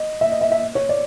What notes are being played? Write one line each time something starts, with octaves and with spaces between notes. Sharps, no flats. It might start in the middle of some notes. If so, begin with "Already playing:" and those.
Already playing: D#5
E5
D#5
E5
E5
C#5
D5